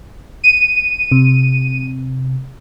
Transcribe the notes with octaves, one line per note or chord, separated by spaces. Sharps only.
D#7
C3